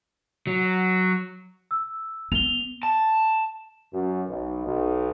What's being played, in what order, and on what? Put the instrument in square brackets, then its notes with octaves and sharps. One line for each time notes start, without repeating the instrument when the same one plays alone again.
[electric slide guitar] F#3
[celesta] E6
[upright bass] B3 [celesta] F7 G7
[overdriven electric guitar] A5
[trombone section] F#2
B1
B1